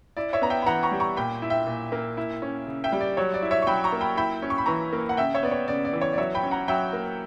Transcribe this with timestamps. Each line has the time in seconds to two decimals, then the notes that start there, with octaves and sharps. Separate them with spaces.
0.17 E4 D5
0.33 C#5 E5
0.42 B3 A#5
0.50 E5 G5
0.62 B5
0.66 E3 F#5 A#5
0.83 A#5 C#6
0.91 G3
1.00 A#5 C#6
1.17 A#2 G5 B5
1.42 E4
1.50 E5 G5
1.67 A#2
1.92 A#3
2.17 E4
2.42 C#4
2.67 C#3
2.84 E5 G5
2.92 G3
3.01 D5
3.17 F#3 C#5
3.34 D5
3.42 E4
3.51 C#5 E5
3.62 C#6
3.67 F#3 G5 B5
3.84 A#5 C#6
3.92 A#3
4.01 G5 B5
4.17 E4 G5 B5
4.42 C#4
4.50 C#6
4.58 B5
4.66 E3 A#5 C#6
4.93 A#3
5.09 F#5
5.17 C#3 E5 G5
5.35 C#5 E5
5.43 B3 D5
5.51 C#5
5.68 C#3 D5
5.85 D5
5.93 E3
6.01 C#5
6.13 D5
6.18 F#3 C#5 E5
6.35 G5 B5
6.43 C#4
6.51 F#5 A#5
6.68 F#3 E5 G5
6.93 A#3